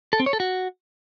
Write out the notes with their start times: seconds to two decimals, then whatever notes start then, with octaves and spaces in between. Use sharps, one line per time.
0.13 A4
0.20 C4
0.26 C#5
0.33 A4
0.40 F#4